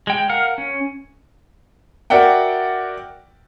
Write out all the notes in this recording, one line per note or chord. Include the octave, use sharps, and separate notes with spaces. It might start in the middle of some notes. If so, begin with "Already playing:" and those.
G#3 G5
A#4 F5 F#5 F6
C#4
F#4 A#4 D5 E5 F#5 G5